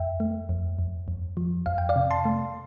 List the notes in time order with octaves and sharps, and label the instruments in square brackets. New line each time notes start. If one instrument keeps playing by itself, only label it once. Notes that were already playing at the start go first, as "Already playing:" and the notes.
Already playing: [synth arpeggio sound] F2 E5 G5
A3
F2
F2
F2
F3
F2 F5
G5
D5 F5
C3
A5 C6
A3